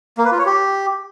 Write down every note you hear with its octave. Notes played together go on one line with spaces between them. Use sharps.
A#3
B4
F4
C#5
G4